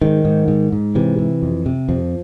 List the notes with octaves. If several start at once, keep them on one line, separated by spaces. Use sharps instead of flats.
G#2 D#3
G#2
G#2
G#2
C3 E3
C3
F2
C3
F2 F3